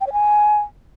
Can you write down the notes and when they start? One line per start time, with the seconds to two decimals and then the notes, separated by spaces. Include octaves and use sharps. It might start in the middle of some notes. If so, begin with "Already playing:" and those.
0.01 G5
0.07 C#5
0.13 G#5